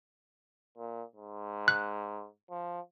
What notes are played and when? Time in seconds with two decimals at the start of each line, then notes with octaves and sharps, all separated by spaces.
0.78 A#2
1.16 G#2
1.68 F#6
2.51 F3